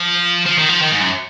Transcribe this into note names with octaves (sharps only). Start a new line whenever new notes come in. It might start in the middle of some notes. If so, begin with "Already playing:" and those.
Already playing: F3
F3
D#3
F3
D#3
G#2
F#2